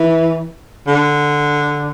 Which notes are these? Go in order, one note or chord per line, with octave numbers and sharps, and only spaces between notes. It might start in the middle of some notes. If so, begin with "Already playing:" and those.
Already playing: E3
D3